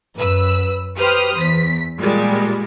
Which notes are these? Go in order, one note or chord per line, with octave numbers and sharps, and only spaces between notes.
F#2 B4 E6
G4 B4 C5 D#6 F6
E2 B6
A#2 G3 G#3